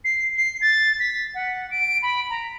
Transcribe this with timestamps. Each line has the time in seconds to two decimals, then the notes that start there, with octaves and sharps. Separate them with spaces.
0.05 C7
0.37 C7
0.61 A6
1.00 B6
1.35 F#5
1.71 D7
2.02 B5
2.30 A#5